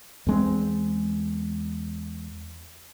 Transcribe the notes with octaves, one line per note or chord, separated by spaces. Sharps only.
E2 G#3 C4